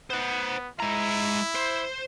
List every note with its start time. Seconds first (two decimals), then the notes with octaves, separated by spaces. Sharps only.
0.10 B3 C5 F#5
0.80 G#3 E4 A#5
1.55 C5